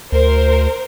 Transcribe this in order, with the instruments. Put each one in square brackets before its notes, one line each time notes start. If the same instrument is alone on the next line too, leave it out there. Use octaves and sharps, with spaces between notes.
[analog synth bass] D2 [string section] A#4 C5